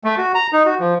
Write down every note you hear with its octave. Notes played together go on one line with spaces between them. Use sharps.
A3
F#4
A#5
D#4
F#4
F3